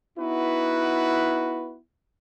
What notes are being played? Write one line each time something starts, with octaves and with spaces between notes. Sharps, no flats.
B3 D#4 E4 F#4 B4